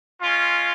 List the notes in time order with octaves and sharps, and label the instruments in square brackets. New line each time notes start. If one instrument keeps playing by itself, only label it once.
[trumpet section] G#3 C#4 F4